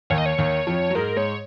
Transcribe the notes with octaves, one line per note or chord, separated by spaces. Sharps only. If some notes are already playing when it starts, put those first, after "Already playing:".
D#2 D#3 C#5
D#5
C#5
D#2 D#3
F2 F3
F#3
G#2 G#3 A#4
G#2 G#3 C#5